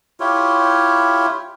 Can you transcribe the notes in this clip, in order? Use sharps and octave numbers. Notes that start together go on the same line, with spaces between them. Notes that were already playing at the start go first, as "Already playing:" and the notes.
E4 F4 G4 C#5